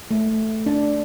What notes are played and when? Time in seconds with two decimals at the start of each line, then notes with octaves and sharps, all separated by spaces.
0.11 A3
0.66 D4